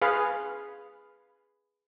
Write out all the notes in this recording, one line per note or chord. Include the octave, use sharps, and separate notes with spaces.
G#4 B4 F5